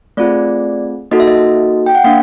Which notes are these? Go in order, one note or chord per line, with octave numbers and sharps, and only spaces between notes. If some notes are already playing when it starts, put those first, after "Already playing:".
A3 C4 F4 G#4 D5
A#3 D#4 F#4 A4 D#5
E5
D#5
G5
F#5
A#3 D4 F5